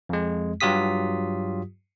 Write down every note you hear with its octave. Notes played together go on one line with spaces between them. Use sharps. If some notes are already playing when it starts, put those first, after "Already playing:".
F2 G#3
G2 F#3 F4 G4 D#6 B6